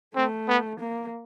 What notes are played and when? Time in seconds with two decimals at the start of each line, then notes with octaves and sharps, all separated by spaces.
0.16 A3 C4
0.48 B3
0.80 A#3